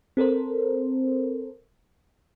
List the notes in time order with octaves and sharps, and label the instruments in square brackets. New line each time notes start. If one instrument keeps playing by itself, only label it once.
[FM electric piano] C4 A4 A#4 C5